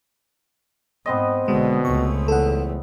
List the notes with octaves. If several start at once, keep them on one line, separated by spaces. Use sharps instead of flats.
G#2 B3 C4 D#5
B1 B2 D3 G#3
C#2 A3 C#6
E2 A4 F#5